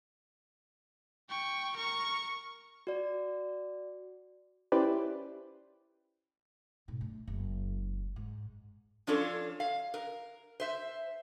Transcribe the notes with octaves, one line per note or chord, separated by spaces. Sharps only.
G5 C#6
A#4 C#6
F#4 D5
C#4 E4 G4 B4 C5 D5
G#2 B2
A3 D4
F#1 G#3
G#2
F3 C#4 D4 F4 A4 C#5
F5
A#4
C5 E5